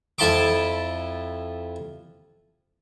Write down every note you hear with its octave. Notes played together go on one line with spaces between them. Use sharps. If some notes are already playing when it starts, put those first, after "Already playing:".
F2 E4 A5 B5 C6 D6